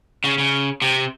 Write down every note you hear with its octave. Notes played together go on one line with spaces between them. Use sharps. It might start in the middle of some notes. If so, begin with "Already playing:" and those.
C#3
C#3
C3